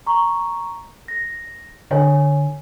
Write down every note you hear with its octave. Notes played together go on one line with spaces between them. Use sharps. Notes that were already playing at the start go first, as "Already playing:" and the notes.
A#5 C#6
A#6
D3 C#5 G#5